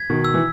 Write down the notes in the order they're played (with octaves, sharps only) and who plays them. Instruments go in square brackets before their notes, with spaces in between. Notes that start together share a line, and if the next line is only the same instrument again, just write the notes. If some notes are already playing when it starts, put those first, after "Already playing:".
Already playing: [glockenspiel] G#6 B6
[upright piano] B2 D#3
[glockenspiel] E6
[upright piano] E3